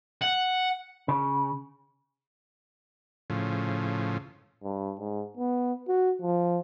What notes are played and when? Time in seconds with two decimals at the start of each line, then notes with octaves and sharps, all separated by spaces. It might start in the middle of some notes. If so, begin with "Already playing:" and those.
0.22 F#5
1.08 C#3
3.30 A2 C#3 F3
4.63 G2
5.00 G#2
5.37 B3
5.88 F#4
6.21 F3